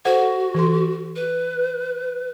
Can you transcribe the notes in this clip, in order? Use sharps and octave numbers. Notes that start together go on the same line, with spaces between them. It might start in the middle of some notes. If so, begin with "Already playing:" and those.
F#4 A4 C5 F#5
E3 A4 C6
B4